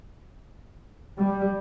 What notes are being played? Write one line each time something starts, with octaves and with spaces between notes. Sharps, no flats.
G3